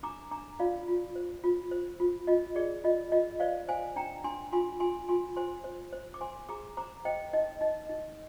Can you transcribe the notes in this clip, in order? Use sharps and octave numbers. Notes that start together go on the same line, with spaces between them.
D4 A#5 D6
D4 A#5 D6
F4 D5 F5
F4
C5
F4
C5
F4
F4 D#5
G#4 D5
F4 D#5
F4 D#5
C5 D5 F5
C5 F5 G#5
D4 G5 A#5
D4 G#5 C6
F4 G#5 C6
F4 G#5 C6
F4 G#5 C6
C5 G#5 C6
C5
C5
D6
C5 G#5 C6
G#4 A#5 D6
C5 A#5 D6
C5 D#5 G5
D#4 D#5
D#4 D#5
D#4